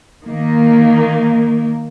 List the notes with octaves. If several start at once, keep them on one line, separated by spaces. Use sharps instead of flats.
D#3 A#3